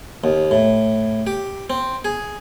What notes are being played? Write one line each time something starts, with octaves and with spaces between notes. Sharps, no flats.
D#2
A2
G4
C4
G#4